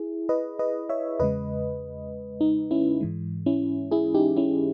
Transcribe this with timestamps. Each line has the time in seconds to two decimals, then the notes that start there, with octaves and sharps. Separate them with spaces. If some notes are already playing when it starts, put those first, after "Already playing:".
Already playing: E4 G#4
0.29 B4 D#5
0.59 B4 D#5
0.89 C#5 E5
1.19 E2 C#3 G#3 B4 D#5
2.41 D#4
2.71 C#4 E4
3.01 G#2 E3 G#3
3.46 C#4 E4
3.91 E4 G#4
4.14 D#4 G4
4.36 C#4 E4